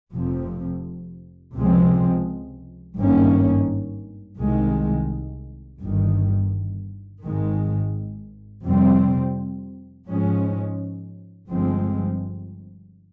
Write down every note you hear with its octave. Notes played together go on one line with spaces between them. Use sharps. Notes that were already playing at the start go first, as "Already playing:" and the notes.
F1 F2 C3 F3
C#2 C3 F3 G#3 C4
G#1 G2 D#3 A#3 C#4
C2 C3 D#3 G#3
G1 G2 D#3
G#1 G#2 D#3 G#3
F2 C3 G3 C4
G#2 F3 G#3 C#4
G1 G2 F3 G#3 C4